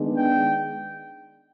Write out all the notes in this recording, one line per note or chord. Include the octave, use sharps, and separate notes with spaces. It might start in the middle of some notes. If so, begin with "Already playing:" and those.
Already playing: D#3 G#3 B3 D4
G5